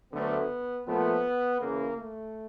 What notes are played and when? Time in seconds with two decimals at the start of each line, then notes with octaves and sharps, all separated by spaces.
0.12 D2 D3 F#3 A3 B3
0.86 A#2 F3 A3 B3
1.60 E2 C#3 E3 A#3
1.96 A3